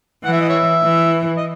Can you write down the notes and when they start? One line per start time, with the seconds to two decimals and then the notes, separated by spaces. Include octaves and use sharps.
0.24 E3 F#5
0.33 E5
0.41 D#5
0.49 C#5 E5
0.84 E3
1.38 D#5